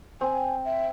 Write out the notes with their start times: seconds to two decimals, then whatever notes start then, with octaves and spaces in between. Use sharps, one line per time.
0.21 C4 G#5
0.65 E5